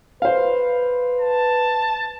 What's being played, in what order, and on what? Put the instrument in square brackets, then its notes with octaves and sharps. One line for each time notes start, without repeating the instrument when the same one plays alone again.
[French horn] B4 [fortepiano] C5 F5
[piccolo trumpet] A5